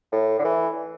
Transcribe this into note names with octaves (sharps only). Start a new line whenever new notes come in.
A2
D3
E3